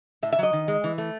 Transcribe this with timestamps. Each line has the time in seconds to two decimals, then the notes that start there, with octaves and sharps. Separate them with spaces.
0.23 A2 E5
0.33 E5
0.39 F#3 D#5
0.53 D#3
0.68 G#3
0.84 E3
0.98 A3